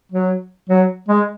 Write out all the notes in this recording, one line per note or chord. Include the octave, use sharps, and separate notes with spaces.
F#3
F#3
G#3